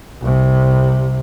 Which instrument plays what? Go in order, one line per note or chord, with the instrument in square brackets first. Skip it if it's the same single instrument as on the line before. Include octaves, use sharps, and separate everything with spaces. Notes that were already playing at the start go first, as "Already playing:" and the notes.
[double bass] C2 C3